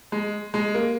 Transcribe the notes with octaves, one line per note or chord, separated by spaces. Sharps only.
G#3
G#3
A#3